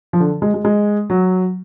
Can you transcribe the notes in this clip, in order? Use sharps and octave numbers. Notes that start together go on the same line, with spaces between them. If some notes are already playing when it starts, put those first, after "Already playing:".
F3
D3
G#3
G#3
G#3
F#3